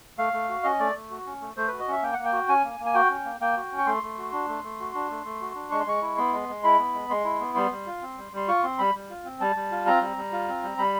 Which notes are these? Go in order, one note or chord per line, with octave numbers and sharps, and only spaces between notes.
A3 F5
A3
F#4
C#4 D#5
A3 D5
A3
F#4
C#4
A3
A3 C5
F#4 B4
D#5
C#4 E5
A#3 G5
A#3 F#5
G5
F#4
C#4 G#5
A#3
A#3
G#5
F#4 G5
C#4
A#3
A#3 G5
F#4
C#4
C#6
A3 C6
A3
F#4
D4
A3
A3
F#4
D4
A3
A3
F#4
D4
G#3 C#6
C6
G#3 C#6
E4
B3 C6
G#3
G#3
E4 B5
B3
G#3
G#3 C6
E4
B3
G3 C6
G3
F4
C4
G3
G3 C6
F4 C#6
C4 C6
G3 B5
G3
F4
C4
G3 A5
G3
F4
C4 A#5
G3
G3
F4
C4
G3
G3 B5